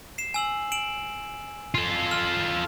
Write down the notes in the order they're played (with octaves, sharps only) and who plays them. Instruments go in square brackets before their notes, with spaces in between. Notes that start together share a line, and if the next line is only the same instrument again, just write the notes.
[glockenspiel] C7 E7
G#5 E6 F#7
D7 E7 F#7
[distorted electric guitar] F4 A4
[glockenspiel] F6